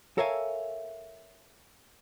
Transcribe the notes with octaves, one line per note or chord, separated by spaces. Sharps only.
A4 A#4 C#5 E5 F5 G#5